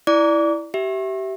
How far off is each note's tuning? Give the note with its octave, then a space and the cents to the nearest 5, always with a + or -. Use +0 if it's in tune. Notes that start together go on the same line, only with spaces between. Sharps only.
E4 +0 D5 +0 D6 -35
G4 -30 E5 +0